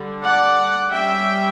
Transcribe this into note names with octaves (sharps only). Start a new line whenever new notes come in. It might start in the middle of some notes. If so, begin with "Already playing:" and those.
Already playing: D3 G3 D4
D5 F#5
G3 C#4 E5 G5